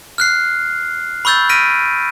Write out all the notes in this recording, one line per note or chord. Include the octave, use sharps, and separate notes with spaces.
F6 F#6 C7
B5 C#6 E6 G6 A6
F6 A#6 B6 D7 D#7